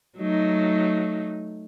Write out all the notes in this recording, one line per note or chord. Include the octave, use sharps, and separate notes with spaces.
F#3 A3 D#4